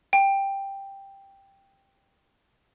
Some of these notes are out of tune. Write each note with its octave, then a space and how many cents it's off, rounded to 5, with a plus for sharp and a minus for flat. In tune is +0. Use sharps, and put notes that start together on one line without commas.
G5 +5